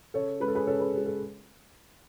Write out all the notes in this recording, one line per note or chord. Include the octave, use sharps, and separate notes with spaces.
C#3 A4 C#5
G#3 C#4 B4
A4
G#4 B4
C#3 A4 C#5
G#4 B4
G#3 C#4
A4